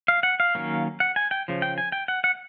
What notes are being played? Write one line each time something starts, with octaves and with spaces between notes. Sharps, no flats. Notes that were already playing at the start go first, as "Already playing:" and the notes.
F5
F#5
F5
D#3 F#3 A#3 C#4
F#5
G#5
G5
C#3 F3
G5
G#5
G5
F#5
F#5